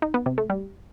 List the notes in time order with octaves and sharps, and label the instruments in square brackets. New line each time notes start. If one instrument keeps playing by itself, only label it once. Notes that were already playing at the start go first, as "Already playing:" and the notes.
[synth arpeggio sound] D#4
B3
C3
A3
G3